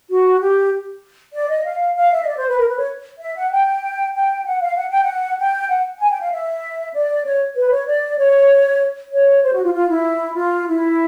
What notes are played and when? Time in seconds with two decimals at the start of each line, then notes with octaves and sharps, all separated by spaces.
0.09 F#4
0.41 G4
1.33 D5
1.50 D#5
1.65 F5
1.96 F5
2.12 E5
2.22 D#5
2.28 D5
2.37 C5
2.48 B4
2.58 A#4
2.68 B4
2.79 C#5
3.20 E5
3.36 F#5
3.52 G5
4.14 G5
4.45 F#5
4.61 F5
4.76 F#5
4.90 G5
5.03 F#5
5.39 G5
5.69 F#5
6.00 G#5
6.11 G5
6.21 F5
6.32 E5
6.94 D5
7.26 C#5
7.56 B4
7.71 C#5
7.87 D5
8.18 C#5
9.12 C#5
9.43 C5
9.53 F#4
9.63 F4
9.74 F4
9.89 E4
10.36 F4
10.68 E4